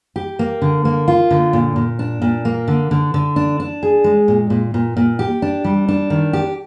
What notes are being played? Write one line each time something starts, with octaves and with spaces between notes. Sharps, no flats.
G4
A#3
D3
A#3
F4
D3
A#2
A#2
D4
A#2
A#3
D3
D3
D3
D4
D4
G#4
G#3
A#2
A#2
A#2
A#2
G4
D4
G3
D4
D#3
G4